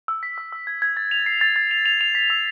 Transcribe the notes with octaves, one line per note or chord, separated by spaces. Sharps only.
E6
B6
E6
E6
G#6
G#6
A6
F7
C7
A6
A6
F7
F7
F7
B6
E6